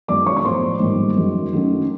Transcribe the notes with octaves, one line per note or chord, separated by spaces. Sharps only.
F#2 D#3 G#3 B3 D5 D6
C#5 C#6
C#6
A2 F3 A3 C5 C6
G#2 D#3 G3 A#3
F#2 D#3 G#3
D#3 F#3 A3 C#4